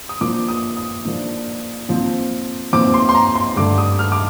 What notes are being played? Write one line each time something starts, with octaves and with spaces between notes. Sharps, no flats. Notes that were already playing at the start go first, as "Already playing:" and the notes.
D#6
A#2 F3 A#3 D4 D6
D#6
D#6
A#2 F3 A#3 D4
A#2 F3 C4
A#2 F3 C4 D6
C6
C6
A#5
C6
G2 D3 A3 D6
D#6
F6
D6